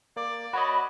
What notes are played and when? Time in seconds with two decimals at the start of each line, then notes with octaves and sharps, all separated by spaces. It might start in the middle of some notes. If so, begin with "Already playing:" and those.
0.16 A#3 D5
0.53 F#4 C#5 D#5 B5